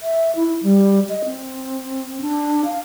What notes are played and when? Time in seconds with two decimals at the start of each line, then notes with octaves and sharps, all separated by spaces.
0.01 E5
0.36 E4
0.63 G3
1.09 D#5
1.25 C4
2.21 D4
2.65 F5